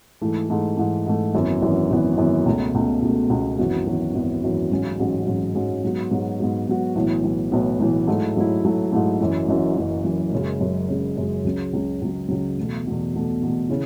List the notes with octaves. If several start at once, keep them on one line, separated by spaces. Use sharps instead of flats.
G#2 E3 A3
G#2 E3 A3
G#2 E3 A3
G#2 E3 A3
G#1 F#2 E3 B3
G#1 F#2 E3 B3
G#1 F#2 E3 B3
G#1 F#2 E3 B3
C#2 B2 A3
C#2 B2 A3
C#2 B2 A3
C#2 B2 A3
G#1 F#2 E3 B3 F#4
G#1 F#2 E3 B3 F#4
G#1 F#2 E3 B3 F#4
G#1 F#2 E3 B3 F#4
A1 G#2 F#3 C#4 F#4
A1 G#2 F#3 C#4 F#4
A1 G#2 F#3 C#4 F#4
A1 G#2 F#3 C#4 F#4
G#2 F#3 B3 F#4
G#2 F#3 B3 F#4
G#2 F#3 B3 F#4
G#2 F#3 B3 F#4
B1 A2 E3 B3
B1 A2 E3 B3
B1 A2 E3 B3
B1 A2 E3 B3
G#2 F#3 A3 E4
G#2 F#3 A3 E4
G#2 F#3 A3 E4
G#2 F#3 A3 E4
F#1 F#2 E3
F#1 F#2 E3
F#1 F#2 E3
F#1 F#2 E3
F#1 F#2 C#3 G#3
F#1 F#2 C#3 G#3
F#1 F#2 C#3 G#3
F#1 F#2 C#3 G#3
C#2 C#3 F#3
C#2 C#3 F#3
C#2 C#3 F#3
C#2 C#3 F#3
E2 B2 A3
E2 B2 A3
E2 B2 A3
E2 B2 A3
C#3 E3